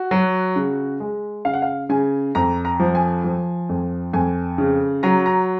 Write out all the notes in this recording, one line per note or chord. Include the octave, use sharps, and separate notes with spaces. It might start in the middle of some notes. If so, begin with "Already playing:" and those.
Already playing: F#4
F#3
C#3
G#3
C#3 F5
F#5
F5
C#3 G#5
F2 A#5
A#5
F3
G#5
F3
F2
F2 G#5
C#3
F#3 A#5
A#5